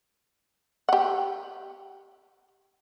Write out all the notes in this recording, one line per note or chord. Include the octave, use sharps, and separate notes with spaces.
G4 F#5